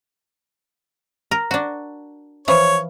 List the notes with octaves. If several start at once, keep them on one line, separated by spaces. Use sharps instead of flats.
A#4
D4 F#4
E3 F3 C#5